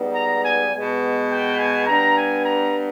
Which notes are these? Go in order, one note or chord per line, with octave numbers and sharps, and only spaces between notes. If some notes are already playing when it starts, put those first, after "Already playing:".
Already playing: G#2 G3 B3
A#5
G#5
B2 G#3 B3
G5
G#5
G2 G3 B3 A#5
G#5
A#5